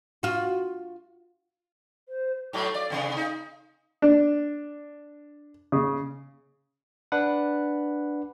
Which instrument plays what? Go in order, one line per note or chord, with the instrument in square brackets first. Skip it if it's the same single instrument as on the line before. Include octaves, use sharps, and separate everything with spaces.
[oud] F4 F#4
[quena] C5
[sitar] A2 F#3 A3 [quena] D6
[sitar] D5 [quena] F5
[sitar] C3 E3 B3
D#4
[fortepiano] D4
C#3
[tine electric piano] D4 B4 F#5